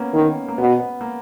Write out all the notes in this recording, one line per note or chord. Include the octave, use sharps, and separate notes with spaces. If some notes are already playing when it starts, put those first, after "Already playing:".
Already playing: A#3 B3 C#4
D#3
A#3
B2 B3
B3
A#3